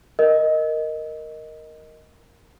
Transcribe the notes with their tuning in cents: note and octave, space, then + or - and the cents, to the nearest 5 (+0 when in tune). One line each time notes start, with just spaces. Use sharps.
A#4 +0 D#5 +0